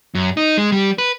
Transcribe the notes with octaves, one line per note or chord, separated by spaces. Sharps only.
F#2
D#4
G#3
G3
B4